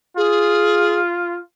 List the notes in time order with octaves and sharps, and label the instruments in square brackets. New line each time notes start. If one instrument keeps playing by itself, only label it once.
[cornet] F4 [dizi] G#4